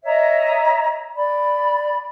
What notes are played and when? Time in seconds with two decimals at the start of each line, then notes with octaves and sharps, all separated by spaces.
0.04 C#5 D#5 E5 A#5
1.15 D5 B5